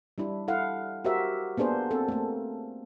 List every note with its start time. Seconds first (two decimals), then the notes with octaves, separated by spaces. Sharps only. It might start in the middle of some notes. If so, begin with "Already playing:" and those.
0.18 G3 D4 E4
0.48 E4 A4 F5 F#5
1.05 F#4 G4 A#4 C5 E5
1.57 A#3 B3 D4 G#4 C5
1.91 C4 A4
2.08 A3 A#3